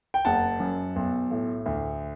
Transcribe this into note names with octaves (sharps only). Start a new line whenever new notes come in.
G5
F#1 F#5 A5
F#2
B1
A2
D2